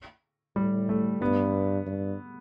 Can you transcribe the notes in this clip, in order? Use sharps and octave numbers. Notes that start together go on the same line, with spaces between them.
A2 G3
A3
G2 B3
G2